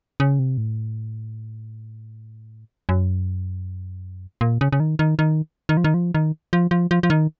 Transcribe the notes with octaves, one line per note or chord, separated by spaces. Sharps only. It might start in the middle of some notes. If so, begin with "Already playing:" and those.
C#3
C3
A2
F#2
A#2
C#3
C#3
D#3
D#3
D#3
D#3
F3
D#3
F3
D#3
F3
F3
F3
F3
D#3